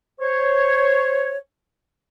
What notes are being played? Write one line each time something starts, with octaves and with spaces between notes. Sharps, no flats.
C5 C#5